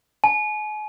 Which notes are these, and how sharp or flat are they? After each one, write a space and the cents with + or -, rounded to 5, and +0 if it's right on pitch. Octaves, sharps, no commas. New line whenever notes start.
G#5 +40